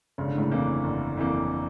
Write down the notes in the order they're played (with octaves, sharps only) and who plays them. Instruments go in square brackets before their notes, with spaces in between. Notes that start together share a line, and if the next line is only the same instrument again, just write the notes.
[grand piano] G1 [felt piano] C#3
[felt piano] D3
A2 C#3
[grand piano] F2 E3 A#3
G1
F2 E3 A#3